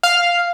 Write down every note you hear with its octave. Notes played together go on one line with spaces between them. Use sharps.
F5